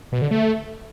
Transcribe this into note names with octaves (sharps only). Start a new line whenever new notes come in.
B2
D3
A3